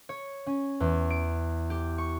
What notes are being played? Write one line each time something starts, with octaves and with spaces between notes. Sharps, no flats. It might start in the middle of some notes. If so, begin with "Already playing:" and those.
C#5
C#4
E2
D7
G4
C#6